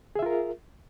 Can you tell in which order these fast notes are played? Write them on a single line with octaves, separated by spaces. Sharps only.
G#4 E5 F4 A#4